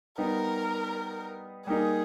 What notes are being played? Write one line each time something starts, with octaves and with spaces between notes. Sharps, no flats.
G3 B3 D#4 A#4
G3 A#3 D#4 G#4